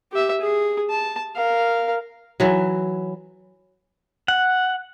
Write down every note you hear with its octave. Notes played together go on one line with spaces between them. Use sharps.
G4 E5
G#4
A5
A#4 F5
E3 F#3
F#5